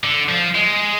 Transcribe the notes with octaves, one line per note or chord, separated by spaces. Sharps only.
D3
F3
G#3